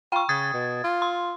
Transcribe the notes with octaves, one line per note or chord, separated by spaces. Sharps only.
F4 G5 C#6
C#3 D#6 G#6 A6
B2
F4
C6